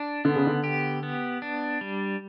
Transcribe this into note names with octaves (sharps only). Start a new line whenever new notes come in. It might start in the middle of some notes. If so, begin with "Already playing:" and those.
Already playing: D4
D3 B3
C#3
D3
G4
B3
D4
G3